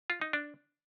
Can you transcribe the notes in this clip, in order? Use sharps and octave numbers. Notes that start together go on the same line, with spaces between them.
F4
D#4
D4